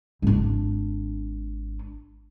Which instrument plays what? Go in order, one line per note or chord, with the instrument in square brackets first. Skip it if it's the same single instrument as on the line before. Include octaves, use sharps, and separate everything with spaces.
[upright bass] G#1 D4